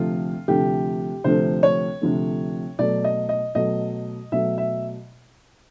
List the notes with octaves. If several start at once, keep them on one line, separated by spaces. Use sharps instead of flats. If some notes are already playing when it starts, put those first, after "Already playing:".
Already playing: D2 C3 F3 A3 F4
D2 C3 F3 A3 G4
D2 C3 F3 A3 C5
C#5
D2 C3 F3 A3
B2 F#3 A3 D5
D#5
D#5
B2 F#3 A3 D#5
B2 F#3 A3 E5
E5